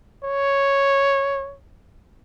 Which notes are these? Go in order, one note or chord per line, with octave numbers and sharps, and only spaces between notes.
C#5